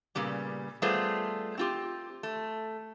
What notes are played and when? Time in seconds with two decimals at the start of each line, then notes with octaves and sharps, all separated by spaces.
0.15 A#2 C#3 G3 B3
0.82 G3 A3 B3 F4 G#4 C5
1.58 C4 F4 G4
2.23 A3